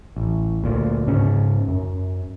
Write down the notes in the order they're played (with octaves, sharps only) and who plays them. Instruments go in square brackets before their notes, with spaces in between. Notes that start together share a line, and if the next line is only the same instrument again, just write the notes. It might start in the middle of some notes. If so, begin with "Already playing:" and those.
[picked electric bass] A1
D2 A#2
G#2 C#3 C#4
F#2